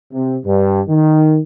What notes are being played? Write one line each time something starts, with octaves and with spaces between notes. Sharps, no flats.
C3
G2
D#3